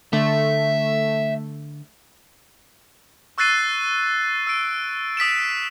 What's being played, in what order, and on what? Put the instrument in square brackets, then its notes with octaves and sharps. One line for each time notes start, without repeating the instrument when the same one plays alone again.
[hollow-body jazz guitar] D3 [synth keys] A3 [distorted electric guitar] E5
[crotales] C#6 E6 F#6 A6 C7 D#7
E6 D7
D#6 B6 D7 E7